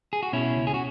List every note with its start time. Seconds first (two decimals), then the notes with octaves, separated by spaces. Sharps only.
0.13 G#4
0.23 F#4
0.33 B2 C#4 E4
0.55 C#2
0.67 G#4
0.74 F#4